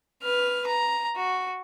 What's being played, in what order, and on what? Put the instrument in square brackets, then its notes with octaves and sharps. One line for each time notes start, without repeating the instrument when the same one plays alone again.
[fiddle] B4 F6
A#5
F#4